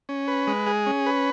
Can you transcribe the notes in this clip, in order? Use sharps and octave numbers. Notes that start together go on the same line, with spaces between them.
C#4
B4
G#3
G#4
C#4
B4